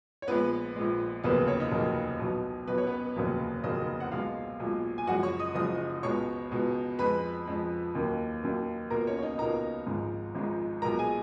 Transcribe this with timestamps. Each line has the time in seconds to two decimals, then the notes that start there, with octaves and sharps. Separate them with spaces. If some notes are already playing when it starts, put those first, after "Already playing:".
0.22 C#5
0.27 A#1 A#2 G#3 B3 B4
0.75 A#1 A#2 G#3
1.24 F1 D#2 C#3 F#3 A#3 B3 B4
1.48 C#4 C#5
1.60 D#4 D#5
1.72 F1 D#2 C#3 F#3 A#3
2.20 B1 B2 F#3
2.67 B1 B2 F#3 B4
2.78 C#5
2.87 B3 B4
3.16 F1 D#2 C#3 F#3 A#3
3.63 F1 D#2 C#3 F#3 A#3 D#4 D#5
4.00 F#5
4.11 B1 A#2 G#3 F4 F5
4.60 B1 A#2 G#3
4.98 G#5
5.07 F#1 F#2 F3 G#3 F#4 F#5
5.23 C#5 C#6
5.39 D#5 D#6
5.55 F#1 F#2 F3 G#3 D#5 D#6
6.03 C#2 B2 G#3 C#5 C#6
6.51 C#2 B2 G#3
6.99 F2 F3 G#3 B4 B5
7.47 F2 F3 G#3
7.95 D#2 D#3 F#3 A#3
8.43 D#2 D#3 F#3 A#3
8.90 C#2 B2 A#3 A#4 A#5
9.07 C#4 C#5
9.19 C#5
9.22 D#4 D#5
9.38 C#2 B2 A#3 A#4 A#5
9.86 G#1 G#2 F3 G#3
10.35 G#1 G#2 F3 G#3
10.82 B1 A#2 G#3 A#4 A#5
10.99 G#4 G#5